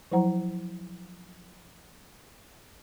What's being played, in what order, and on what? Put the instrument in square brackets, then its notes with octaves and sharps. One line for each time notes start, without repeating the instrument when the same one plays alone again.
[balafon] F3 F#3 E4 C5 F#5 A#5